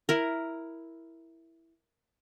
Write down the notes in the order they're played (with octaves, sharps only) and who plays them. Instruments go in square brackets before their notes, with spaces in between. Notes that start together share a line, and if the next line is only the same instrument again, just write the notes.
[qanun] E4 A#4